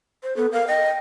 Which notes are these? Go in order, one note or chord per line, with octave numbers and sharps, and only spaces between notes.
C5
B3 A4
A#4 F5
D#5 G5